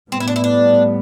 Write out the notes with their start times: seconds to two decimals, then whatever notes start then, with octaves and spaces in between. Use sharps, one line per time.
0.12 A2 G3 B3 C4
0.20 E4
0.28 D4
0.36 E4
0.44 D4